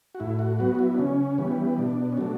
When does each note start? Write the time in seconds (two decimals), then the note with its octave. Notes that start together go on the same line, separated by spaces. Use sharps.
0.15 F#4
0.20 A2 E4
0.39 F#4
0.59 F#3 B3 F#4
0.75 F#4
0.79 E4
0.95 D4
0.99 C#3 C#4
1.38 E3 G3 B3
1.79 B2 D4
2.12 C#4
2.17 F#3 A3 D4